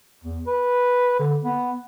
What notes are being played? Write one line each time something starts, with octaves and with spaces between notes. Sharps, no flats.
E2
B4
D3
B3